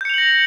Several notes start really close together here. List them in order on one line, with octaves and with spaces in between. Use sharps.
G6 C#7 F7 F#7 A#6